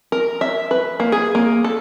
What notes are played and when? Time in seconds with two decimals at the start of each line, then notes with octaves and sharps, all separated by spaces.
0.12 A#4
0.41 E5
0.71 B4
1.00 A#3
1.12 G#4
1.35 A#3
1.64 A4